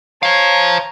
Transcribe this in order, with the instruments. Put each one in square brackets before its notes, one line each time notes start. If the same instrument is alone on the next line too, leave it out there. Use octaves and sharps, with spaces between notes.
[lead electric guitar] C5 F5 [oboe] C#5 [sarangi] A#5